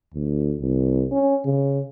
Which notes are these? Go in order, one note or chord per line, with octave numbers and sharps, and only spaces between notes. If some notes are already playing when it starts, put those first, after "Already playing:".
D2
C2
C#4
C#3